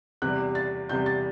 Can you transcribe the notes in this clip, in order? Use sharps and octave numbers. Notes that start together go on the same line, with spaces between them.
E2 C3 G3 F#6
A6
E2 C3 G3 G6
A6